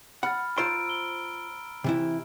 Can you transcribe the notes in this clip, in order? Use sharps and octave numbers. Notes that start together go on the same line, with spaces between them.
F#5 B5 F6 A6
F4 C5 A#5 C6 E6 D7
E6 G7
C3 E3 E4